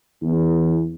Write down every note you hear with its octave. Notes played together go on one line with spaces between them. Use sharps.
E2